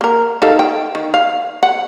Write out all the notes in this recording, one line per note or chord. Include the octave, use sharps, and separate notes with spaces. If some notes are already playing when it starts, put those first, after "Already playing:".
A#3 A#4
D#4 A4 F5
G5
D#3
F5
F#5